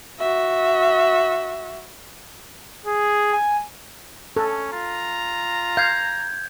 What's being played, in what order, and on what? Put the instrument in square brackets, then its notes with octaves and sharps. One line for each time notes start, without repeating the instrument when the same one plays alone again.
[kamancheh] F#4 E5
[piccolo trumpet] G#4
[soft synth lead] G#5
[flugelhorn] C#4 [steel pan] A4
[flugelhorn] F4 [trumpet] A#5
[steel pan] F5 [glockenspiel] G6 G#6